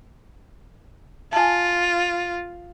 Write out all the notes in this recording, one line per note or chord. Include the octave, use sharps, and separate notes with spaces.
F4 G#5 A5